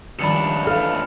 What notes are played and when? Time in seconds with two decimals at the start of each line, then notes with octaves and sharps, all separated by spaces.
0.19 C#2 D#3 F3 G3 D4 B5 C#7
0.67 E3 G#3 A4 F5 F6